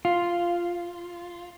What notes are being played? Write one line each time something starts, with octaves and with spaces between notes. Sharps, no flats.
F4